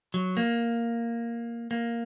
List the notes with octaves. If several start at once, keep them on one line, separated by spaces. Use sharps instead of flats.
F#3
A#3
A#3